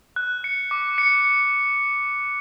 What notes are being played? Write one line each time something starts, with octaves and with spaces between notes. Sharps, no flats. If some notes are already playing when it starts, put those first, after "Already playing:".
F#6
C#7
D6
C#7
C#7